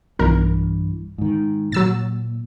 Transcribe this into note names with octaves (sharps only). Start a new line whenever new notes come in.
B1 G2 E3 A#4
G#2 D#3
A#2 F#3 E6 A6